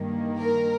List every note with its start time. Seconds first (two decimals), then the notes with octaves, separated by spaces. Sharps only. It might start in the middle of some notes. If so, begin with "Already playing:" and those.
Already playing: G2 D#3 A#3
0.39 A#4